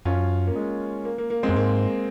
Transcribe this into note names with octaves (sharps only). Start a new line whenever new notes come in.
F#2 C#4 F4
A#3
G#3
A#3
A#3
A#3
G#3 C4
F#2
G#2 A#3